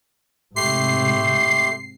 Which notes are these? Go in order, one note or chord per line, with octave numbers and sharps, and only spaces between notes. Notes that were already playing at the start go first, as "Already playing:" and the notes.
G#2 C3 A3 G4 C6 C7